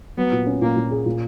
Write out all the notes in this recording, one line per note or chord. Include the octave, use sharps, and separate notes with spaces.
F#3 B3
A#2
C#4
A#2 A#3
A#2
G#4
A#2